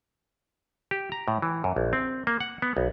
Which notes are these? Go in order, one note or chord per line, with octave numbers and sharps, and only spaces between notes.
G4
A#5
A2
E3
F#2
A#1
C4
A#3
F#5
B3
B1